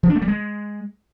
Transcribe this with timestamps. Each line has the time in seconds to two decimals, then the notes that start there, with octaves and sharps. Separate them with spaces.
0.03 F3
0.09 D4
0.15 A3
0.22 G3
0.28 G#3